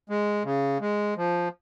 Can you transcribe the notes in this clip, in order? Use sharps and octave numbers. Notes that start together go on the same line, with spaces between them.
G#3
C#3
G#3
F3